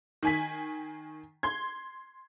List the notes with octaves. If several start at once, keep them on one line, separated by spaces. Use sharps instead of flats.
D#3 G#5 B6
C6 G#6